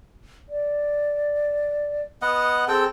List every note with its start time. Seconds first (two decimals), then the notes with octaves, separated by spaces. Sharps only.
0.49 D5
2.22 B3 D#5 F#5
2.68 C4 G#4 A4 G5